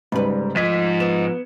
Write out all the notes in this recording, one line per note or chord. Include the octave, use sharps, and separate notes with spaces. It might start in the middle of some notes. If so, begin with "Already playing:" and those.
D2 G#2 C#3 G3 B4
G#2 F3 D#5 G#6 B6
B3 E7